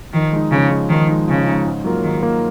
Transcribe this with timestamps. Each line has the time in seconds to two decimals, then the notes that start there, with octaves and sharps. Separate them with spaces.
0.13 D#3 F3
0.32 G#3 D#4
0.51 C#3 F3
0.70 G#3 D#4
0.89 D#3 F3
1.09 G#3 D#4
1.27 C#3 F3
1.47 G#3 D#4
1.65 G#2
1.84 F#3 A#3 F4 A#4
2.03 G#2 D#3
2.22 F#3 A#3 F4 A#4